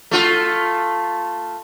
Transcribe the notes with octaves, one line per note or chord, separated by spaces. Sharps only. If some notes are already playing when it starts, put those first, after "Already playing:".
A3 F4